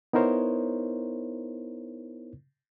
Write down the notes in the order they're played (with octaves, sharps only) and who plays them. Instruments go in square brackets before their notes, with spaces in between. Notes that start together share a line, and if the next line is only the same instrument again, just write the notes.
[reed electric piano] B3 D#4 E4 A#4 C5 C#5